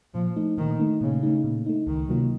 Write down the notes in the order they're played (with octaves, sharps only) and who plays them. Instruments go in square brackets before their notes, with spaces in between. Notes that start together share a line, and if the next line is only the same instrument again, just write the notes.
[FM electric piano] A#2 [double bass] F3
[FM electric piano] A3 D#4
[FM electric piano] A#2 [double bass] D#3
[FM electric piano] A3 D#4
[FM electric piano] A#2 [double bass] C#3
[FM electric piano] A3 D#4
A#2
A3 D#4
[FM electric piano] C#2 [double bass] D#3
[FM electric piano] C3 F#3 A#3 F4